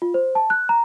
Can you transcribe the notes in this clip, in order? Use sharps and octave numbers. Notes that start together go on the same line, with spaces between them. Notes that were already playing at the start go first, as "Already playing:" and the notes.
F4
C5
A5
F#6
A#5